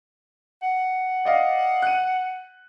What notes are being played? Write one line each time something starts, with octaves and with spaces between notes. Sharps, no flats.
F#5
D5 D#5 F5
F#6 D#7